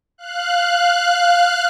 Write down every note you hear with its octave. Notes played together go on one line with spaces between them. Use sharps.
F5 F#6